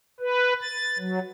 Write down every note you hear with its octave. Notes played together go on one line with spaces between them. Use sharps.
B4
A6
F#3